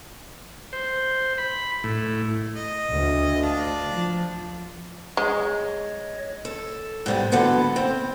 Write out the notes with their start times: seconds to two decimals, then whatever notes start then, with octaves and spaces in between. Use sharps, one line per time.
0.73 C5
1.38 B5
1.84 A2
2.56 D#5
2.91 D2
3.42 D4 F4
3.91 F3
5.17 G#3 C#5 D#5
6.45 A4
7.06 G#2 G3 B3
7.32 D3 F#3 B3 A4 B4
7.76 C4